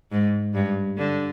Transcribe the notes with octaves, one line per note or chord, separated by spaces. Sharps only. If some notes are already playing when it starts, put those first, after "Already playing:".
G#2
G2
D3